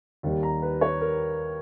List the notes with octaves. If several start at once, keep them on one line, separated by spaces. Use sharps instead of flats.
D#2 D#3 G3
A#5
B4
C#5
A#4